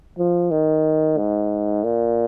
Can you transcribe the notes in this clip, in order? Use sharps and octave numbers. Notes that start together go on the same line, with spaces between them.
F3
D#3
G#2
A#2